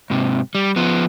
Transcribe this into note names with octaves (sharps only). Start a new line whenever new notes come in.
G#2 C3
G3
F3 B3